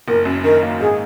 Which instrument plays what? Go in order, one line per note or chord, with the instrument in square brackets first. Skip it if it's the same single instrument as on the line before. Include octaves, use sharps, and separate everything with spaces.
[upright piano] F#1 [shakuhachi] A#4
[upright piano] F#2
[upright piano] D#3 [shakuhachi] A#4
[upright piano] A#3
[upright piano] G#2 [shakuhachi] G#4